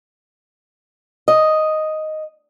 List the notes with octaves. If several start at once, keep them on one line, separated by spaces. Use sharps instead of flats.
D#5